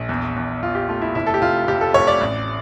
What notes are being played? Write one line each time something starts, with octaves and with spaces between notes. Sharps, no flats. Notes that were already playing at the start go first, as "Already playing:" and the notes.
Already playing: A#1
E2
E2
E2 F4
G4
A3 F4
E4
F1 E4
A4
G4
F1 F4
F1 G4
A4
F1 C#5
D5
A1